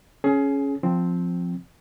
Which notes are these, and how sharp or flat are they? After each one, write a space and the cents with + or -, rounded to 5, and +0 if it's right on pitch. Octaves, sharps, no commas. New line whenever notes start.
C#4 +0 G#4 +25
F3 +10 C4 +0